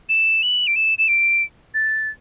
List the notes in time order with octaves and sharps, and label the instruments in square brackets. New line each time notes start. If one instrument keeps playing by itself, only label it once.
[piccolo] E7
F#7
D7
E7
E7
D7
A6